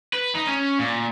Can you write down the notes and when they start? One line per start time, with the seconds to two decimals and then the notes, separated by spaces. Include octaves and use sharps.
0.13 B4
0.35 D#4
0.47 C#4
0.79 A#2